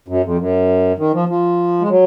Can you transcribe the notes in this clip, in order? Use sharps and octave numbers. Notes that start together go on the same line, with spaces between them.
F#2
F2
F#2
D#3
F3
F3
G#3
F#3